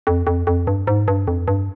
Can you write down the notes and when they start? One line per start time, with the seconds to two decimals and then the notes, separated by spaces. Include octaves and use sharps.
0.07 F2
0.27 F2
0.47 F2
0.67 G2
0.87 G#2
1.08 G2
1.27 F2
1.48 G2